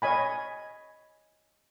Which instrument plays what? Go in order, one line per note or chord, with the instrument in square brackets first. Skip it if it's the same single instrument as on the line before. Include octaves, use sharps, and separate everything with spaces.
[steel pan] C#5 D#5 G#5 B5